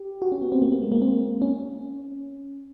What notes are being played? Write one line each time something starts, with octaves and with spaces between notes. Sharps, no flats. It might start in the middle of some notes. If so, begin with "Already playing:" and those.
Already playing: G4
F#4
C#4
B3
C4
A#3
A#3
G#3
A#3
C4
C#4